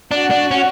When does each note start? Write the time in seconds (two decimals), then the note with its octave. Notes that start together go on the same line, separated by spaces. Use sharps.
0.11 D4 F#4
0.31 D4
0.51 C#4